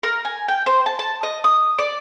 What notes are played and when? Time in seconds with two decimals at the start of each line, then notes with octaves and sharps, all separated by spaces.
0.03 A#4
0.25 G#5
0.48 G5
0.66 C5
0.86 A5
0.99 A5
1.23 D#5
1.44 D#6
1.78 D5